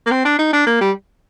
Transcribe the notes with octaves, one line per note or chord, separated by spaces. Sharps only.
A#3
C4
D4
D#4
D4
A#3
G3